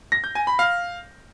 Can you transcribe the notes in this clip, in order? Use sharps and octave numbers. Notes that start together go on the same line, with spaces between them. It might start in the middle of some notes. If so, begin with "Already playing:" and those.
A#6
G6
G#5
B5
F5